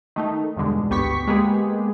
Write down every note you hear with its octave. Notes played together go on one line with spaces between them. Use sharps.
D#3 A3 D#4
E2 G2 B2 D3 G#3
G#1 D2 B3 G4 C#6 B6
G#3 A#3 B3 G4 G#4